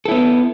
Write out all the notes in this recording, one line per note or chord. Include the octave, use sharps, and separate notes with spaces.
B3 E4 A4